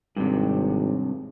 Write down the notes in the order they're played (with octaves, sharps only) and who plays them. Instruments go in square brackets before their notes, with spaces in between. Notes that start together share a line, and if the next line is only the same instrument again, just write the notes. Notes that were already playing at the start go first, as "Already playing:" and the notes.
[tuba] G#1 [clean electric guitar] G2 C3